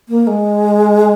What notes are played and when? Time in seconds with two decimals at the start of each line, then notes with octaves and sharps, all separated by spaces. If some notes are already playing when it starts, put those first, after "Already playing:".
0.09 A#3
0.27 G#3